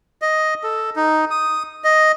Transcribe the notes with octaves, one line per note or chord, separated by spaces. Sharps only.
D#5
A4
D#4
D#6
D#5